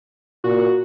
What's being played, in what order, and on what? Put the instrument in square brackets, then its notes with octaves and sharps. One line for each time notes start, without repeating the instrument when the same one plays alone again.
[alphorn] A#2 [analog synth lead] F#4